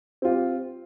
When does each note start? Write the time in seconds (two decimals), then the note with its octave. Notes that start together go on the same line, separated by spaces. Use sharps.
0.22 C4
0.25 F4
0.27 G4